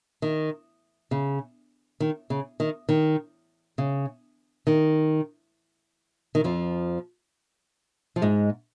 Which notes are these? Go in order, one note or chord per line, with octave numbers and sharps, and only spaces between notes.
D#3
C#3
D#3
C#3
D#3
D#3
C#3
D#3
D#3
F2 F3
F3
G#2 G#3